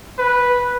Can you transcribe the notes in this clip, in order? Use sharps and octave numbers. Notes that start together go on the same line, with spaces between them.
B4